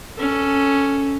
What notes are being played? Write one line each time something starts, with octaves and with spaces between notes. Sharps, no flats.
C#4 A4